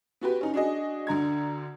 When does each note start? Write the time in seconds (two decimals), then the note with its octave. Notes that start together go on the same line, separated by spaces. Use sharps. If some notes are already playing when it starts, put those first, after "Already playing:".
0.21 B3 F#4 G4 B4
0.41 C#4 D#4
0.54 D4 F#4 G#4 D#5
1.07 D2 D3 A#5 G#6